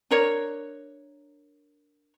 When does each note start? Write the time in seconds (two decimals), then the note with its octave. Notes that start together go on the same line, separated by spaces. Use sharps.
0.11 D4 A#4 C#5